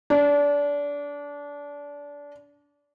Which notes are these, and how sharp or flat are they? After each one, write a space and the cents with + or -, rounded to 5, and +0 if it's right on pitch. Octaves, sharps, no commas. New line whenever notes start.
D4 -25